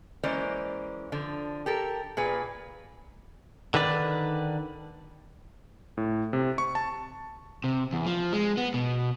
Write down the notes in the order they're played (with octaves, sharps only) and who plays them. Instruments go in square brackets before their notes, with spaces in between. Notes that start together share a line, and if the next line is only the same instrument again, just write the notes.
[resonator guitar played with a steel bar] E3 G#3 A#3 C#4 C5 D5
D3 F3
G4 A4 A#4
A#2 G#4 B4
[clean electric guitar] D3 D#3 B4 D5
[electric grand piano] A2
C3
C#6
A5
[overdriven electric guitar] C3
E2
F3
G#3
B3
B2